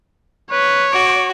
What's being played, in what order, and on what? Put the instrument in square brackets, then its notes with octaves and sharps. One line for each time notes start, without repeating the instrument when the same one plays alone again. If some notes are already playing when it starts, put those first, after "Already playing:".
[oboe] B4 [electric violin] C#5
[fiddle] F#4 [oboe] D6